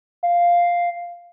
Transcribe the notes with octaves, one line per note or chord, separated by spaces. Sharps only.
F5